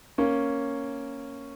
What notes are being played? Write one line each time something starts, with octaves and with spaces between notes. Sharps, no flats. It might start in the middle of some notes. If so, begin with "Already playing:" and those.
A#3 C#4